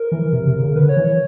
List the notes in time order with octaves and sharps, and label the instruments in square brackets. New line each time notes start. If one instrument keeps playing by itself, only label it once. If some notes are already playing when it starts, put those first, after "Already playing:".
Already playing: [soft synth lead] A#4
[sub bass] E3
C3
C3
C#3
[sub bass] D3 [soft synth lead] B4
[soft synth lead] C#5
[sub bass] E3
[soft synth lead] C#5